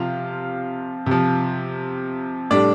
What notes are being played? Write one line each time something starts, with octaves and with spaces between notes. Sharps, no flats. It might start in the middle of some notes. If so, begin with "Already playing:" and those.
Already playing: C3 F3 F4 F5
C3 F3
A2 G3 D4 D5